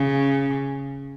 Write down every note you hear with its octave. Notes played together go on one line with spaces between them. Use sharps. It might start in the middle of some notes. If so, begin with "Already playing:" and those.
Already playing: C#3